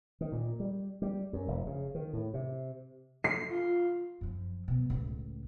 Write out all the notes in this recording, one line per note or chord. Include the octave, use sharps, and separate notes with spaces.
D#3
A#2
G3
G3
F#2
F1
C#3
D#3
A2
C3
C7
F4
F#2 F3
B2
C#2 A2